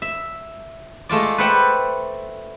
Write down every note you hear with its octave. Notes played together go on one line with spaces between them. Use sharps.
E5
G#3 A3 F4 D5
B4 C5 D5 E5 F#5 G5